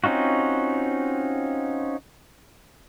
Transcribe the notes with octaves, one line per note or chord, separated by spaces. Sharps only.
C4 C#4 D#4 F4 F#4